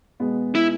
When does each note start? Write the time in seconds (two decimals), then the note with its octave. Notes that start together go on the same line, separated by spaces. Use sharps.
0.20 B2 G#3 B3
0.55 E4